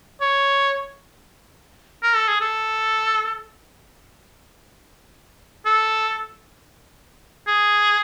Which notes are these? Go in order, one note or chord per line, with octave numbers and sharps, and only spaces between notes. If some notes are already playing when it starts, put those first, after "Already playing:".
C#5
A#4
A4
G#4
A4
A4
G#4